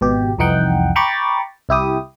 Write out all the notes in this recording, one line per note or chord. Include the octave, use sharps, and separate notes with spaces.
G#1 B2 G4
C2 F2 E3 D#4 F#5 G5
G5 A#5 B5 C#6 D6 A6
C2 E4 G4 D#6